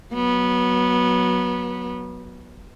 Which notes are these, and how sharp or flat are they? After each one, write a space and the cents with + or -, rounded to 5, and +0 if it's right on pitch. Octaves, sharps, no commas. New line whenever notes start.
F#3 +0 B3 -20